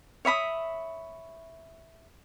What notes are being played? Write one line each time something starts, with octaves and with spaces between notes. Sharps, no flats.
C#5 E5 B5 D#6